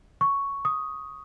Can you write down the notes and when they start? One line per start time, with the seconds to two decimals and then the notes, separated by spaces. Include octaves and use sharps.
0.21 C#6
0.65 D#6